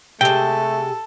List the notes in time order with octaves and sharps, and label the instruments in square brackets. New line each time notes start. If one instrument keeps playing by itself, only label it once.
[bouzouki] C3 G#3 [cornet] A3 [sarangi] A4 [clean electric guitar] G5